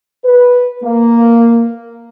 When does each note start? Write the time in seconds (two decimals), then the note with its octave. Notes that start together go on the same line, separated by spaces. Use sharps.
0.24 B4
0.84 A#3